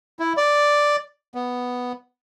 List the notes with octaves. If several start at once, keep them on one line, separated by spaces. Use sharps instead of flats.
E4
D5
B3